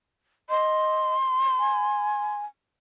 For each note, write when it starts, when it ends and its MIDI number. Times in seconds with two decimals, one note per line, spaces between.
0.50 1.16 75
0.50 2.34 84
1.59 2.46 80